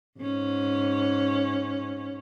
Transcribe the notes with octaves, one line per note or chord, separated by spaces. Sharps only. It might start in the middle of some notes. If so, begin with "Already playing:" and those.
G#2 C#4